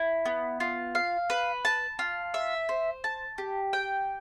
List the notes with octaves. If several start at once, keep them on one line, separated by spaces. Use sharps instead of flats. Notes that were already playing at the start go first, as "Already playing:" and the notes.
Already playing: E4
B3
F4
F5
B4
A5
F4
E5
C5
A5
G4
G5